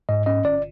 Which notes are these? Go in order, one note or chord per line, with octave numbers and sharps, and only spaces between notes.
G#2 D#5
C#4 D#5
G1 D5